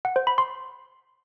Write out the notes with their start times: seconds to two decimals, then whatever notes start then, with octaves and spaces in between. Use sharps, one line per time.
0.05 F#5
0.16 C5
0.27 B5
0.38 C6